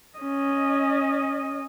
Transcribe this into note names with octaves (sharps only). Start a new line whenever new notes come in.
C#4 D#5